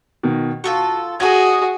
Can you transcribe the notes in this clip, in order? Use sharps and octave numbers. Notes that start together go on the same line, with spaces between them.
B2 D#3
F4 F#4 A4 C#6
F#4 G#4 D#5 D#6 G#6